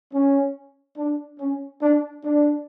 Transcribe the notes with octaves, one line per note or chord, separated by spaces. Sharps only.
C#4
D4
C#4
D4
D4